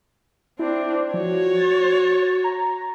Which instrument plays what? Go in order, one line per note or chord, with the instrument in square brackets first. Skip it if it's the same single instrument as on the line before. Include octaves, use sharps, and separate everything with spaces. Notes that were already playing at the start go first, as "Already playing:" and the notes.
[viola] C4 D4 [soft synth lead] E4
[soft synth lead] F3 [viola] F#4 C#5
[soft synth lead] A6
A#5